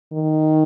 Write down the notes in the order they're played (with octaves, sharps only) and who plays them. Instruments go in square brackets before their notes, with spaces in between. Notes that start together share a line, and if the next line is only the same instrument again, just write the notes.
[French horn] D#3